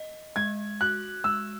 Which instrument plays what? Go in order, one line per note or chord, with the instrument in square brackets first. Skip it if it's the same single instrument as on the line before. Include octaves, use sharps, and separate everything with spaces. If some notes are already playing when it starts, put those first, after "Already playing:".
Already playing: [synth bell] D#5
[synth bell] G#3 [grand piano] G#6
[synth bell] F#4 [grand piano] F#6
[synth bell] G#3 [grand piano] E6